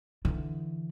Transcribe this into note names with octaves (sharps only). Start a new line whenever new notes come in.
D3 E3